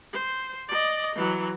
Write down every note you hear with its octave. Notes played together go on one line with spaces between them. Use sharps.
C5
D5 D#5
E3 F#3